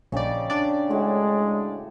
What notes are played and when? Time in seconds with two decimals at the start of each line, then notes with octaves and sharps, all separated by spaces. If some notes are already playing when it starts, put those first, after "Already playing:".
0.12 A#1 C#3 G3 D#4 D5
0.50 D4 D5
0.90 A2 G#3 F#4 E5